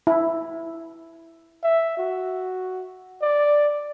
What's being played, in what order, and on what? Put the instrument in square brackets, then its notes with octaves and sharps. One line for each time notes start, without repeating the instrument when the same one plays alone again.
[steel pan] E4
[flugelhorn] E5
F#4
D5